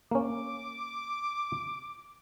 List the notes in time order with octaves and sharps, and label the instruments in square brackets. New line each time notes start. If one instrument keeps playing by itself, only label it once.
[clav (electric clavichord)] A#3 C#4 [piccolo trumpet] D6